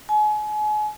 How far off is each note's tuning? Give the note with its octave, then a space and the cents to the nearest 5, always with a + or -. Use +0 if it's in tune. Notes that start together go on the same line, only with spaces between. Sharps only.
G#5 +35